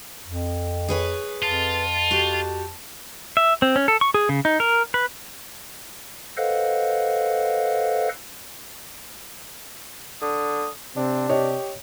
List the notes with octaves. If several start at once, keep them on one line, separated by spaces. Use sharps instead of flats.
F2
G#4 B4 C#5
F2 F4 A5
F#4 G4
E5
C4
C#4
A4
C#6
G#4
C#3
D#4
A#4
B4
A4 B4 C5 D#5 F5 F#5
D3 D#6
C3 C4 D4
G4 C#5 D#5